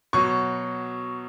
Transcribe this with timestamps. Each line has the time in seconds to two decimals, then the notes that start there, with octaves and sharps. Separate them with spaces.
0.13 B2 F#3 C#6